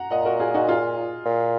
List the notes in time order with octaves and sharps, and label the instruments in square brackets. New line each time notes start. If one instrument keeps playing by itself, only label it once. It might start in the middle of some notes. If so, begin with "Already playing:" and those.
Already playing: [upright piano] F#5 A#5
[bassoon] A#2 [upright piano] D#5 F#5
[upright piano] F#4 A#4
F4 G#4
D#4 F#4
F4 G#4
[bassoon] A#2